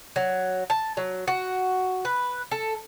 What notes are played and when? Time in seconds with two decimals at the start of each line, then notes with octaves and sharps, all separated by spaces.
0.16 F#3
0.70 A5
0.97 F#3
1.28 F#4
2.05 B4
2.51 A4